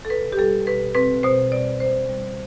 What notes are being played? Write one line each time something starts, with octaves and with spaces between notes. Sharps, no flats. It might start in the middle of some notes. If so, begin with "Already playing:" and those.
A4
B2 B4
G4
G3 A4
B2 B4
C4 B4
B2 C5
G3 D5
B2 C5
G3